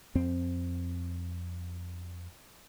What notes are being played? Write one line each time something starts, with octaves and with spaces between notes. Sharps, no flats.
F2 C4